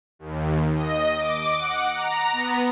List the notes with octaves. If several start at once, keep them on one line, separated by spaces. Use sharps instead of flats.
D#2
D#5
D6
F#5
A#5
B3